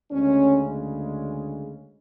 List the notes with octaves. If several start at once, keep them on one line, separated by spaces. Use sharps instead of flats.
D2 C#3 G#3 C#4